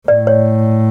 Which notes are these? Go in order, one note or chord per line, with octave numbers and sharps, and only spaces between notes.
A2 D5
C#5